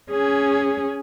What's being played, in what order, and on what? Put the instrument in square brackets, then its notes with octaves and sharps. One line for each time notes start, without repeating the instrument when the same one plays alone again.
[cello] C#4 G#4